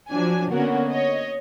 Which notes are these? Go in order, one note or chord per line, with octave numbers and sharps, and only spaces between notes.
F3 F#3 D4 G#5
D3 A#3 B3 C#4 F#4 A#4
C#5 D#5